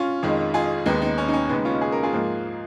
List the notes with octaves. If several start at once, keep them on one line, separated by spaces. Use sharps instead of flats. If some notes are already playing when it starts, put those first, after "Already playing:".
Already playing: C#4 F4
F2 D#3 G#3
F4 G#4
D#2 D#3 G#3 B3 D#4
B3 D#4
C#4
D#4
C#4
D#2 C#3 G#3 B3 D#4
C#4 F4
G#4
A#4
F4 G#4
G#2 F3 A#3